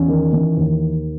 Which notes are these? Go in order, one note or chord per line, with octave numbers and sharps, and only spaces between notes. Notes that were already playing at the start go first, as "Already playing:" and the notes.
Already playing: E2 C#4
D#3
E3
D#2